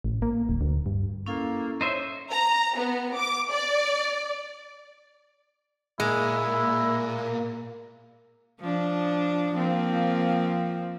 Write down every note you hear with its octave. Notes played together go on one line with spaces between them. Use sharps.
A1
A#3
D1
D2
G2
A#3 C#4 E4 A4
D#4 C5 C#5 E5
A#5
B3
D6
D5
A#2 G#3 A#3 E4
F3 D4
F3 A#3 C4